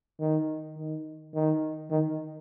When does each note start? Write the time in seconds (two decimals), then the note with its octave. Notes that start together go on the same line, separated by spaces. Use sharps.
0.20 D#3
0.77 D#3
1.34 D#3
1.91 D#3